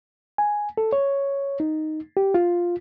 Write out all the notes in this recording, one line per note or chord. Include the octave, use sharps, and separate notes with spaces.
G#5
A4
C#5
D#4
G4
F4